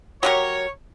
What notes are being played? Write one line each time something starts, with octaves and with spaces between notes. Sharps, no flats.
F#3 G4 A#4 C#5